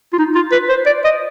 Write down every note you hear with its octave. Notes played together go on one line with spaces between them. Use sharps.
F4
D#4
F4
B4
C5
D5
D#5